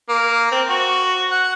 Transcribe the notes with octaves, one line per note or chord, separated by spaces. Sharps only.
A#3
C4
F#4
F#5